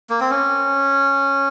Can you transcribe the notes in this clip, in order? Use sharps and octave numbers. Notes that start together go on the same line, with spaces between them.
A#3
C4
C#4